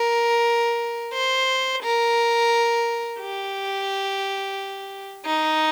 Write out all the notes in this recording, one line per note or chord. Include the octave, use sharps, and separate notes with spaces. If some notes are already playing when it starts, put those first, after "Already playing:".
Already playing: A#4
C5
A#4
G4
D#4